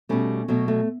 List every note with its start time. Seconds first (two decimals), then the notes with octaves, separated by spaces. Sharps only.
0.09 B2 G3 A3 C#4
0.48 B2 F#3 A3
0.68 A3